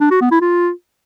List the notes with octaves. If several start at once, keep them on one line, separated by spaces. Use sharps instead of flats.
D4
F#4
B3
E4
F4